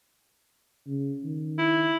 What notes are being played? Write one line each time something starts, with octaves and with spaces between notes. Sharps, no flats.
C#3
D#3
E4